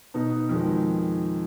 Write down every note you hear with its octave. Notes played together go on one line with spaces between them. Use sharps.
B2 B3 D#4
F2 D#3 G#3